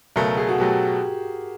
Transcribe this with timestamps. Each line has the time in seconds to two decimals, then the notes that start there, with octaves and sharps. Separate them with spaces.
0.16 C#2 B2 F#3 A3 A#4
0.37 G#4
0.49 F#4
0.58 B2 F#3 A3 G4